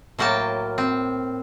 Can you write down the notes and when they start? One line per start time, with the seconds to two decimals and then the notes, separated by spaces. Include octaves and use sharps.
0.19 A2 F#3 A#3 G5 A5
0.78 C4